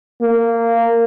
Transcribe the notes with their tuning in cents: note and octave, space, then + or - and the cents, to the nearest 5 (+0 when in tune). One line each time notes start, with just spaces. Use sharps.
A#3 -15